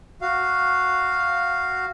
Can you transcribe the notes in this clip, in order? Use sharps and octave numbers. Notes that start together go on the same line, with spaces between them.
F#4 F5